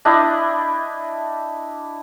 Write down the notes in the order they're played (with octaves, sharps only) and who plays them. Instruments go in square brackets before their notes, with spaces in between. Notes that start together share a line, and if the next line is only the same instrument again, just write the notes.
[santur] D4 E4 D#5 G5